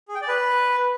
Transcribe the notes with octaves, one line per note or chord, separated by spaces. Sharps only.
G#4
G5
D5
B4